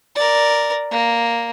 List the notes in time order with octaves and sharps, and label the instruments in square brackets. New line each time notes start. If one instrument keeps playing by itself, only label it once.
[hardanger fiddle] A#4 D5
A#3